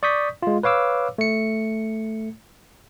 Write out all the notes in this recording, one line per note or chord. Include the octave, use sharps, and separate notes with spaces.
D5 C#6 D#6 G6 B6
G#3 F4
B4 C#5 F5 D6 E6
A3 C#7